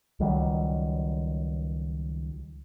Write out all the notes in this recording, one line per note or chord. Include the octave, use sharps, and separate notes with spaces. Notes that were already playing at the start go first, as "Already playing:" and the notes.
C#2 D#3 F#3 G3